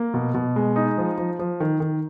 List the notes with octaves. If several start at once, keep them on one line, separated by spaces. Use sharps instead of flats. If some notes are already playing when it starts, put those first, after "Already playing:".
Already playing: A#3
B2
B2
G#3
D#4
F3
F3
F3
D#3
D#3